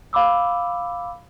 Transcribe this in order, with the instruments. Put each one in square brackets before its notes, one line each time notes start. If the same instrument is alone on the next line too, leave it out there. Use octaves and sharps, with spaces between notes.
[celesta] F5 B5 D6 E6